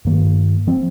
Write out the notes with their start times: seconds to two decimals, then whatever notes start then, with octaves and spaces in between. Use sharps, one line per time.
0.05 G2 D#3 A#3
0.67 F3 C4